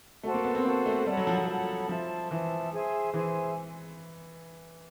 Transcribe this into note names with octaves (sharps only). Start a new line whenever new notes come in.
A3 F#4 A4 C5
A#3
B3
C4
A#3 F#4 A4 C5
A3
G3 A4 C#5 F#5 B5
F#3
F3
F3
A4 C#5 F#5 B5
F3 C5 E5 A5
E3 C5 E5 A5
G#4 C5 E5 G#5
E3 G#4 C5 E5 G#5